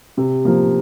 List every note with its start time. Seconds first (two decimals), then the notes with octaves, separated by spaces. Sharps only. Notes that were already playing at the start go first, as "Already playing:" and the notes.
0.17 C3
0.45 F3 A#3